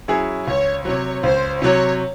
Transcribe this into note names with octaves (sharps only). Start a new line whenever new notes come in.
F#3 C#4 E4 G#4
C#2 C#5
C3 F#3 C#5
C#2 C5
C3 F#3 C#5